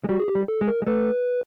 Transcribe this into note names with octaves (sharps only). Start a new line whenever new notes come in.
G#3
G3 F#4
G#4
G4
G3
A4
G#3
A#4
G#3
A3 B4